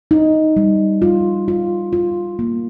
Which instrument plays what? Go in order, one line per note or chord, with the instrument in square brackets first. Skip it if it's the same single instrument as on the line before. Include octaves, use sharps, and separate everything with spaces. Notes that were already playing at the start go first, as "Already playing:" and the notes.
[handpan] D#4
G3
F4
F4
F4
A#3